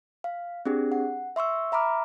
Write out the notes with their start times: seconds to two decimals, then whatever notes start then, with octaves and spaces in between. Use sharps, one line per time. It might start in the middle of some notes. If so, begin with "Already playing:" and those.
0.24 F5
0.66 C4 D4 G4 G#4
0.92 F#5
1.36 E5 C6 C#6 E6
1.72 E5 A#5 B5 D6 F6